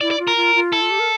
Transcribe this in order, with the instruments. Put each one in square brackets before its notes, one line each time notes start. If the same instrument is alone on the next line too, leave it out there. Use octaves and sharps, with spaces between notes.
[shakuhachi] E4 [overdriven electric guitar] D5
[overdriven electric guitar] D5
[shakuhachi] F4
[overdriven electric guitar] A#4
[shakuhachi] F4
F4
[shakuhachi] E4 [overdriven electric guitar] A4
[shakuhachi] F4
G4
A#4